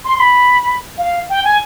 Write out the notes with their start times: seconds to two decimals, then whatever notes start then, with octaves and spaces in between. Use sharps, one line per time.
0.05 C6
0.16 C6
0.20 B5
0.98 F5
1.29 G5
1.45 G#5